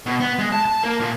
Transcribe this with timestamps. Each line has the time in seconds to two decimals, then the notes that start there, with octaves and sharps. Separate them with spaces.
0.06 B2
0.20 B3
0.39 G#3
0.52 A5
0.66 A5
0.83 A#3
1.00 A#2